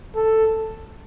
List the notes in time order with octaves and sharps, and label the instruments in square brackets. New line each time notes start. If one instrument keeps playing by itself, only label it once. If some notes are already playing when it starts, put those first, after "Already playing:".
[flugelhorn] A4